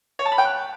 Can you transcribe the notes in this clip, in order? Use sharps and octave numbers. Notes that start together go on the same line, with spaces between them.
C#5
A5
B5
G5
F#6